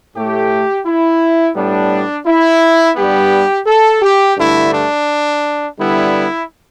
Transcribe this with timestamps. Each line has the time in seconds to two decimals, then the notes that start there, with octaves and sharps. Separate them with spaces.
0.15 A2 A3 G4
0.85 E4
1.56 A2 G3 B3 D4
2.26 E4
2.96 G2 G3 B3 G4
3.67 A4
4.02 G4
4.37 G2 D3 A3 E4
4.72 D4
5.77 D3 G3 B3 E4